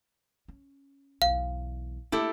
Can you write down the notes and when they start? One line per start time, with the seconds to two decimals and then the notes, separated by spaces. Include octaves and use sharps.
0.48 C#4
1.22 B1 E2 F5
2.12 A3 A#3 E4 G4 A4